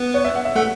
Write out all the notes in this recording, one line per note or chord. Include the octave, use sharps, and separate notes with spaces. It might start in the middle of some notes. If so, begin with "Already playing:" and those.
Already playing: B3 B4
C#5
E5
F#5
E5
A3 A4 F#5